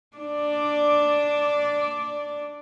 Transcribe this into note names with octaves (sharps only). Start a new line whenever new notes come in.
D4 D5